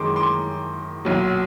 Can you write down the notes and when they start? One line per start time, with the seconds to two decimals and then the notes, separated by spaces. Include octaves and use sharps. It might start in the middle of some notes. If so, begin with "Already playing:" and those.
Already playing: F#2 D#3 G#3 C6 D6
0.16 C6 D6
1.05 B1 A#2 F#3